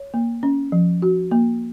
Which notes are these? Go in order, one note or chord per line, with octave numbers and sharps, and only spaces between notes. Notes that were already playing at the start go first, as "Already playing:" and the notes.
Already playing: C#5
A#3
C#4
F3
F#4
A#3